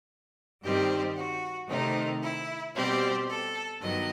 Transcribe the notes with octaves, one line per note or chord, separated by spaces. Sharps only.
G2 D#3 G3 C4 G4
F#4
C3 D#3 A3 C4 D#4
E4
B2 G3 C4 G4
A4
G2 D#3 F#3 B3 D#5